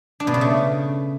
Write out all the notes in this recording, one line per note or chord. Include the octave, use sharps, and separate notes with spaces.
D4
B2
C#3
A3